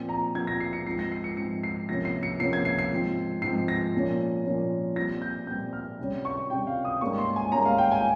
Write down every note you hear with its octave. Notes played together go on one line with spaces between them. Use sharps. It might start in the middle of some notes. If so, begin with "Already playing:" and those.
Already playing: A#2 F3 C4
A#5
A#2 F3 C4 G#6
A#6
C7
C#7
G#2 F3 C4 C7
A#6
C7
C#7
G#2 F3 C4 C#7
C7
C3 F3 A#3 C#4 A#6
C7
C#7
C3 F3 A#3 C#4 C7
G#6
C7
C7
G#2 F3 C4
G#2 F3 C4 C7
A#6
A#2 F3 A#3 C#4
A#2 F3 A#3 C#4
A#2 G3 C4 A#6
G6
A#2 G3 C4 G6
F6
C3 G3 C#4
C#6
C3 G3 C#4 G5
F5
D#6
G#2 G3 A#3 C#4 C#6
C6
G#5
G#2 G3 A#3 C#4 A#5
F5
G5
G#5